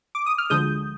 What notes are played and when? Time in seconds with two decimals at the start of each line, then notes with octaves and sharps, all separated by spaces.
0.15 D6
0.26 D#6
0.38 F6
0.50 D2 D3 F3 G#3 D#6 G6